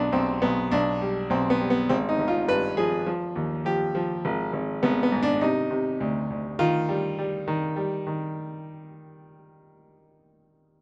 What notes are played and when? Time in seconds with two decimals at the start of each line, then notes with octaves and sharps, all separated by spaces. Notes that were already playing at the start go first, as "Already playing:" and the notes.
Already playing: B1 B3 D4
0.12 B1 C4
0.42 B1 B3
0.71 B1 D4
1.02 G3
1.30 B1 C4
1.50 B3
1.60 G3
1.70 B3
1.89 G#1 C4
2.09 D#4
2.19 G#1
2.28 F4
2.48 G2 B4
2.77 F3 G#4
3.06 F3
3.36 D#2
3.65 F3 G4
3.95 F3
4.25 G#1
4.53 G#1
4.83 G#1 B3
5.03 B3
5.12 G#2
5.23 D4
5.41 C3 D#4
5.71 C3
6.00 D2
6.30 D2
6.59 D#3 F4
6.89 G3
7.19 G3
7.48 D#3
7.76 G3
8.07 D#3